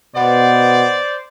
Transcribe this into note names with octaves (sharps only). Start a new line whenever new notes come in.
B2 B3 C5 D5